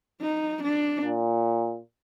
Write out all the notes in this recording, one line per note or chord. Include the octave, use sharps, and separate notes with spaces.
D#4
D4
A#2